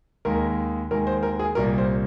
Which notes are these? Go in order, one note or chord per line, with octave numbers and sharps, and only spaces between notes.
D#2 D#3 G#3 A#4
D#2 D#3 G#3 A#4
C5
A#4
G#4
C2 A#2 G3 A#3 A#4
C5